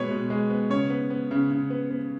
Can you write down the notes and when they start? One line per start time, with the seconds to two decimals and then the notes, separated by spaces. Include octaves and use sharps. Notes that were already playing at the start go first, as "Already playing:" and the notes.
Already playing: B2 G#3 B3 B4 C#5
0.10 B2
0.30 G#3
0.50 B3
0.70 C#3 C#5
0.90 B3
1.10 B3
1.31 C#3
1.51 C#3
1.70 B3
1.91 B3